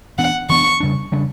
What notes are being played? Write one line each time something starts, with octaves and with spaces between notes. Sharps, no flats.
E3 B3 D4 F#5
E3 B3 D4 C#6
C#3 G3 D4
C#3 G3 D4